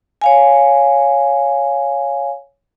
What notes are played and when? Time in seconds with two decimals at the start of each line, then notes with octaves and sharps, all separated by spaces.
0.22 C#5 F5 G#5